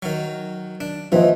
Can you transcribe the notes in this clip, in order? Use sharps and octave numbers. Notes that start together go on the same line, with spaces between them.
D#3 F#3
D4
D#2 E3 F3 C5 D#5